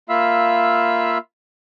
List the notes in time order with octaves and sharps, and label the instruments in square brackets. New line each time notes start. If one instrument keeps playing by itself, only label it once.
[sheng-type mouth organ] A#3 F4 E5 F5 B5 E6